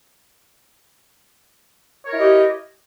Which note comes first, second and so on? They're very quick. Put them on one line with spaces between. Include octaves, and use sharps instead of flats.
C#5 A#4 E4 D#5 G4